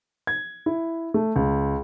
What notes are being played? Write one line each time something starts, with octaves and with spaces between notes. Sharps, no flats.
G#6
E4
A3
C#2